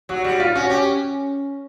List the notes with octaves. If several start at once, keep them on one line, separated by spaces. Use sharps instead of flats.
F#3 F#4
G3 F#4
F4
C#4 F#4
C#4 G4